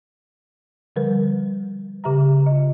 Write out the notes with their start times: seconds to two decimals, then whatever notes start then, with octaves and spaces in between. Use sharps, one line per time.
0.96 D3 F3 G3 A#4 B4
2.04 C#3 G4 E5 A#5
2.46 F4 D#5